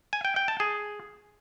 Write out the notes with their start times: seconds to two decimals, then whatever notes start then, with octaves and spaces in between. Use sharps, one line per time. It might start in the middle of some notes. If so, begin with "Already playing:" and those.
0.13 G#5
0.25 G5
0.36 G5
0.48 A5
0.60 G#4